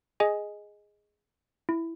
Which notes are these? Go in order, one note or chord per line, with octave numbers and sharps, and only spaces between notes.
G#4 D#5 G#5
E4